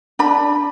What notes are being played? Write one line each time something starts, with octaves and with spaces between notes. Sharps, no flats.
D4 B5